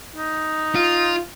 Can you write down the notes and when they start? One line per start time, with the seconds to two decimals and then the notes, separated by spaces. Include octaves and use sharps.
0.16 D#4
0.75 F4